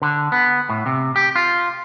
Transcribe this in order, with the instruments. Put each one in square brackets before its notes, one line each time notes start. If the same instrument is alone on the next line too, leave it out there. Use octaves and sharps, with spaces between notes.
[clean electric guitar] D3
B3
A2
C3
G4
F4